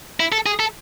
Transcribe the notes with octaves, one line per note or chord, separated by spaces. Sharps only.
E4
A4
G#4
A4